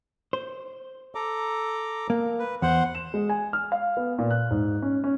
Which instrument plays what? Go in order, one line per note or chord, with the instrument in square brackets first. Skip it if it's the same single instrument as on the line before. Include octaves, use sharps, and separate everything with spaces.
[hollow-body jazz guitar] C5
[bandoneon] A4 A#5 D6
[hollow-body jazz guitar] A#3
[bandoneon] B4
[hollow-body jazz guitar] E2 [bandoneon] C5 F#5
[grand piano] E7
G#3
G#5
F6
F5
B3
A#2
F#6
G#2
C#4
C#4